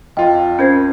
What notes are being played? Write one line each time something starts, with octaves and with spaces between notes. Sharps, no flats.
F2 F4 D#5 G5
C#4 A#4 C5 G6 G#6 C7